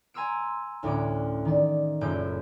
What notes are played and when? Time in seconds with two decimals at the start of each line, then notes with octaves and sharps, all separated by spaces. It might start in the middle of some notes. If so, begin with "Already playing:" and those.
0.14 G#5 A#5 C6 E6 D7
0.83 D2 A2 D3 C#4 D6 D7
1.45 D#3 D5
2.01 F#1 F#2 A#2 A3 G6 D7